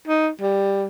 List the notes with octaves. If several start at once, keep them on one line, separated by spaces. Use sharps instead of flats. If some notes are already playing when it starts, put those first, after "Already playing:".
D#4
G3